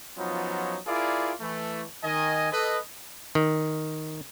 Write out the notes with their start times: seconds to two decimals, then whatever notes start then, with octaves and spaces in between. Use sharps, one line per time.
0.17 F3 F#3 B3 C#4 D#4 F4
0.87 E4 F4 G#4 A#4 D5
1.40 E3 A3
2.03 D#3 D#5 G#5
2.52 A4 B4 D#5
3.35 D#3